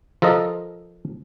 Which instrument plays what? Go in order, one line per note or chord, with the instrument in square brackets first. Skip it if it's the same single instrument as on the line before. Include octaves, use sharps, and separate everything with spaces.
[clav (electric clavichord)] F3 A4 A#4 D#5